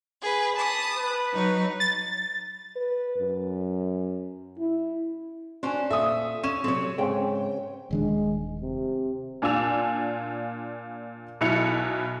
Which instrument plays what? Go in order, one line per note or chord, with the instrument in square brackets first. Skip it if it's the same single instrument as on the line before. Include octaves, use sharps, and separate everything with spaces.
[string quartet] G#4 B4
[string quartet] A5 D#6 [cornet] B5
[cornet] B4
[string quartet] F#3 D#4
[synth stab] A6
[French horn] B4
F#2
E4
[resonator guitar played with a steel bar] C#4 D4 C5 [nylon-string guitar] F#4 G#5
[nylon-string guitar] A#2 A4 [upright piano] E5 D#6
[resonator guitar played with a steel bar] C#4 [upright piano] E7
[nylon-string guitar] C3 F#3 A4 [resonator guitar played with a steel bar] C4 C#5
[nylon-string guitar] G#2 [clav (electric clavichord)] C#3 C4 [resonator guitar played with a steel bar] G5
[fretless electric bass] D#1 D#3 D4 [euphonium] G#3
[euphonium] C3
[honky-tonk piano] A#2 D4 F4 G#5 E6 F7
B1 B2 F#3 E4 C#7 F7